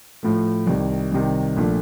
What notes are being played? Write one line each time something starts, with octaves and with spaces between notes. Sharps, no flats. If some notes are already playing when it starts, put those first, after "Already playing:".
A2 F3 A3
C2 C3 D#3
C2 C3 D#3
A#1 A#2 F3 A3 D4